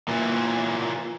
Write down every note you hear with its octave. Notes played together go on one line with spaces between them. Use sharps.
A#2 E3